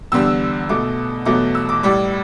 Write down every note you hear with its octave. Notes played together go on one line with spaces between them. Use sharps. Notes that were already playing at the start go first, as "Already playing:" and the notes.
E2 D3 G3 E6
B2 A3 D6
E2 B2 F#3 A3 D6
E6
D6
A2 G3 D6